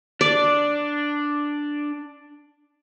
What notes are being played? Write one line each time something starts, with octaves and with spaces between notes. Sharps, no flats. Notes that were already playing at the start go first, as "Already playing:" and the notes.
D4 D5